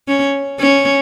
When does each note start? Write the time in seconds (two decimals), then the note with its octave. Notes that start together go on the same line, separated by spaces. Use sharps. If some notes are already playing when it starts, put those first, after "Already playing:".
0.08 C#4
0.60 C#4